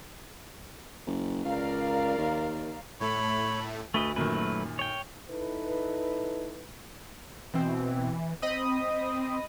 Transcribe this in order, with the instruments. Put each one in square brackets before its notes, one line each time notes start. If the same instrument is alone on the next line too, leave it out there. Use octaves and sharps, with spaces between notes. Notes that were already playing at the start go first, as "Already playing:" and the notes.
[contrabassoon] F#1
[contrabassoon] C#2 [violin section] A#4 D5 F5
[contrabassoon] D#2
[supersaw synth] A2 A3 [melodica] C#5 [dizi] B5
[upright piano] D2 [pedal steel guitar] A3 B4 D#5
[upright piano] F#2 A#2 D#3 [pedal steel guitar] F#3 A3 B4
[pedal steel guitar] C#5 G5
[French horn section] D#4 E4 A4 B4
[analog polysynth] B2 C4 [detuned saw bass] E3
[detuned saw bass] C4 [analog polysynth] D#5 B5 D#6